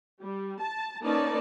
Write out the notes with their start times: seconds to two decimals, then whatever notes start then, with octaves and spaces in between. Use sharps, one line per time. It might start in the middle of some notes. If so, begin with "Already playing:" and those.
0.21 G3
0.61 A5
1.03 A#3 C#4 D#4 B4 D5 A5